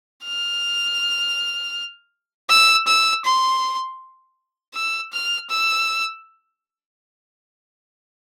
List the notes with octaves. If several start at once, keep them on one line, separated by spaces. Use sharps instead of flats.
F6
E6
E6
C6
E6
F6
E6